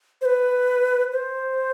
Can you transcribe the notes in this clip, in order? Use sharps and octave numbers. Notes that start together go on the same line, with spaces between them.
C5
B4
C5